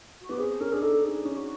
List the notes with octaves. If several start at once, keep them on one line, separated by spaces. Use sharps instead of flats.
F#4
B3 G4
C4 G#4
C#4 A#4
D4 G#4
D#4 A4
D4 G#4
C#4
F#4